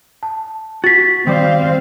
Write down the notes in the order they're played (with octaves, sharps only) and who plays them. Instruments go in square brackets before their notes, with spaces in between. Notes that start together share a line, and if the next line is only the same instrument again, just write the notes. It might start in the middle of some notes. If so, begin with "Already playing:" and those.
[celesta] A5
[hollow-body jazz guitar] F#4 [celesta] A6 B6
[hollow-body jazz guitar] D#3 G3 D5 [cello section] C4 F5